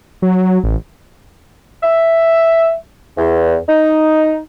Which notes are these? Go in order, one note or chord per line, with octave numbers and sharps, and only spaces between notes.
F#3
A1
E5
E2
D#4